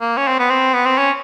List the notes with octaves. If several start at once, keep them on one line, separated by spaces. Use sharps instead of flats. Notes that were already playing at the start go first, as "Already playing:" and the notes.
A#3
C#4
C4
B3
C4
B3
C4
C#4